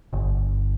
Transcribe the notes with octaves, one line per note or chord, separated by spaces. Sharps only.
G1